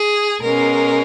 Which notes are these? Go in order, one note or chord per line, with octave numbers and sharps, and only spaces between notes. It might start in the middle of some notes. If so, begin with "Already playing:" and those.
Already playing: G#4
B2 G#3 C#4 A#4